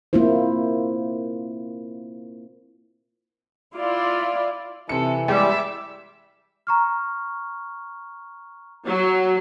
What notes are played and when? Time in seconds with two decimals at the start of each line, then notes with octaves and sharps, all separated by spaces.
0.13 A#3 C4 E4 F4 C5
3.75 E4 F4 D5
4.89 C3 E3 A4 C#7
5.28 G3 G#3 E5 D6
6.67 A#5 C#6 F6
8.85 F#3